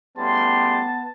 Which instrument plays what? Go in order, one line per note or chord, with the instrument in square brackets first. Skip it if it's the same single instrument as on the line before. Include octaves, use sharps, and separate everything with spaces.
[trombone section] A2 C#3 G3 [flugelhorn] B3 [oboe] A5 [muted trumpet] C6